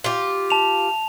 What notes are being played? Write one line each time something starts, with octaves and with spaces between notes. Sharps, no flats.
F4 G4
A5 F7